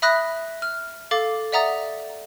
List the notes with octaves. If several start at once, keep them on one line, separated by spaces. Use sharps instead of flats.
E5 B5 D#6 F#6 A#6 B6
F6
A4 F5 D6 A6
D5 E5 F#5 A#5 D#6 A6